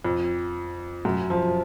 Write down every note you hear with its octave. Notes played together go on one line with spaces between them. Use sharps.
F2
F#2
F3